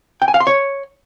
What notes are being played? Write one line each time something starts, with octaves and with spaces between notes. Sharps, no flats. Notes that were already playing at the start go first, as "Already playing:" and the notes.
G5
G#5
F5
C6
C#5